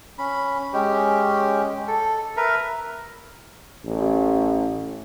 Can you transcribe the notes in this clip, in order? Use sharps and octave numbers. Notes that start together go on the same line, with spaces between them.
C#4 B5
G#3 C#4 G4
A4
A#4 B4 E5 A#5
A1